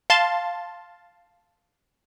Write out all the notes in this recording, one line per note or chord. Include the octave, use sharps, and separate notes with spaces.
F5 A5 C6 A6